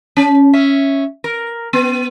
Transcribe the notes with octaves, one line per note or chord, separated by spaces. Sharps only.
C#4
C#4 E5
A#4
B3